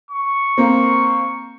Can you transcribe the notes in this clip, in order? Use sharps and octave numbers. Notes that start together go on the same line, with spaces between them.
C#6
A#3 C4